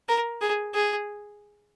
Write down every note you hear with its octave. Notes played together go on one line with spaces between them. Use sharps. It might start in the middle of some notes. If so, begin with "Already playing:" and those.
A#4
G#4
G#4